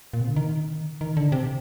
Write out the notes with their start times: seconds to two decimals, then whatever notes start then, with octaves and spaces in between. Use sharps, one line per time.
0.13 A#2
0.21 C3
0.29 D3
0.36 D#3
1.01 D#3
1.17 D3
1.32 C3